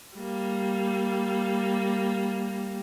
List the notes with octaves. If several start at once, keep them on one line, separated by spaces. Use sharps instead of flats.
G3 A#3